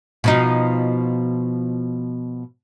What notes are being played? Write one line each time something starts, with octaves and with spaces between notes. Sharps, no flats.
B2 F3 D#4